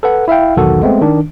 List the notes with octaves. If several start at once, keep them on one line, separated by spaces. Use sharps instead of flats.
A4 B4 F#5
E4 E5 F5 G5
B1 E2 D#3 F#4 A4 F#5
G#3 A3 B3 C4
D#3 D4